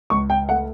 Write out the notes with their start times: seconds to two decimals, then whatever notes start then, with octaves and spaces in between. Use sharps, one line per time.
0.10 C#2 C#6
0.30 G5
0.49 A3 F#5